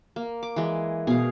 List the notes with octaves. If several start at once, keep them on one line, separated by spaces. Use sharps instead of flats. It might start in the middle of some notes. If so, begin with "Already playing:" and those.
A#3
D6
E3 G#3
B2 G#4 F5